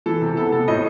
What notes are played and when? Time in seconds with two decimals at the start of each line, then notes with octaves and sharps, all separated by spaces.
0.06 E3 A4
0.21 C3
0.36 B3 A4
0.52 C3 A4
0.68 A2 D#5